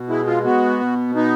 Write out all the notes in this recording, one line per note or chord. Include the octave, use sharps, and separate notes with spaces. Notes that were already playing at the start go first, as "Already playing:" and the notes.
Already playing: B2
G#3 E4
F4
B3 F#4
B2
B3 D#4